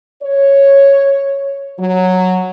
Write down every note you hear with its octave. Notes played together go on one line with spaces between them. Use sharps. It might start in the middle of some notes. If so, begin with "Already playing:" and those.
C#5
F#3